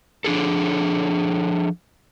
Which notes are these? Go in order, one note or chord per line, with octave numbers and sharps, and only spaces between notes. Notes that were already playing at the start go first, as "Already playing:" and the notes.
F3 D4 G#4 A4